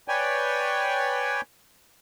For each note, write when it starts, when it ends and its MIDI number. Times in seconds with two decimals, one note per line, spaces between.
0.08 1.41 71
0.08 1.41 73
0.08 1.41 74
0.08 1.41 79
0.08 1.41 80